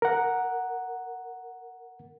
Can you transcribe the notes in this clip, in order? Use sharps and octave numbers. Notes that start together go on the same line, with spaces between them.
A#4 F#5